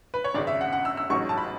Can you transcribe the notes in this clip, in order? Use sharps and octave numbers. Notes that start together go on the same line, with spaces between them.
B4
C#5
G#1 F#2 C#3 D5
E5
F#5
F#5
E6
E6
A1 G#2 F#3 C#6
A5
B5